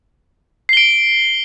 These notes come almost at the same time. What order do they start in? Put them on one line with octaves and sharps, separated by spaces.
C7 G7 D7